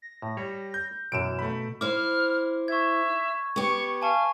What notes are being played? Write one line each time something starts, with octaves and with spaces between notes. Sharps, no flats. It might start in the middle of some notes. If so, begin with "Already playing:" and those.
A#6
A2
G3 C#5
G6
F#2 B2 E3 D7 E7
A3 B5
E4 C5 D6 F6
E5 C#6 G#6
B3 G4 C#6
F5 G#5 A5 C#6